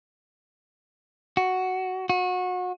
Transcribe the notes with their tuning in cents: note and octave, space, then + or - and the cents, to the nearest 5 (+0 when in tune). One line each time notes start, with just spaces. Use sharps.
F#4 +5
F#4 -30